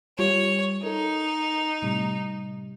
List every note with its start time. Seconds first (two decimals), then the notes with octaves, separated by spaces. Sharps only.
0.19 G3 F4 G4 C#5
0.83 D#4 A4 A#4
1.82 A2 C3 G3